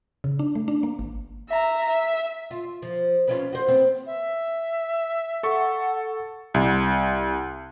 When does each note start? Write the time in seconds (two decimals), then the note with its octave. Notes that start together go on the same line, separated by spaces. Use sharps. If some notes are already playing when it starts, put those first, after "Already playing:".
0.24 C#3
0.39 D4
0.55 A3
0.68 D4
0.83 A#3
0.99 G#1
1.49 E5 A#5
1.90 E5
2.51 F4
2.82 F3
3.28 B3 C#4 F4
3.53 F#4 C5
3.68 B3 C4
4.06 E5
5.43 A4 F#5 C#6
6.54 C2